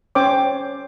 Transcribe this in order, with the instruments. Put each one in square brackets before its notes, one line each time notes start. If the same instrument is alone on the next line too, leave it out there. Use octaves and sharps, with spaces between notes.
[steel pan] C#4 C5 C#5 G5 D6